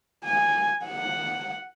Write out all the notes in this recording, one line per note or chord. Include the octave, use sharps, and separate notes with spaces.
G#5
F#5